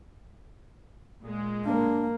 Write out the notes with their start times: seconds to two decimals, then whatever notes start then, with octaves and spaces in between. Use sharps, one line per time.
1.22 A#2 G#3
1.66 A#3 D4